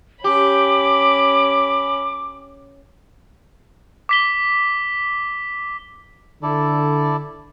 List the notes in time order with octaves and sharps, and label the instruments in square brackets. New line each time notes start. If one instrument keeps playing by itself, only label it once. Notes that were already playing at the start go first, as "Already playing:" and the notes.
[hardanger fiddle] C#4 B5 [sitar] G4 [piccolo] D6
[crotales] D6 B6 G7
[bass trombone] D3 [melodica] E4 A4 D5